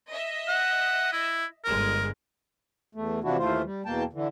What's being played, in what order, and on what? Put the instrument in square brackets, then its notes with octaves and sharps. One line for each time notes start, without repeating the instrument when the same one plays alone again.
[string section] D#5 E5
[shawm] F#5
E4
[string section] G1 G#3 [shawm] A#4
[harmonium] E2 A3
C3 E3 F3 D4 E4 F#4
D#2 E3 A3 F4 C5
G3
E2 B2 A#3 G5 A5
D3 E3